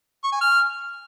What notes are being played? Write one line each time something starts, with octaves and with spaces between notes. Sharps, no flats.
C#6
G#5
F6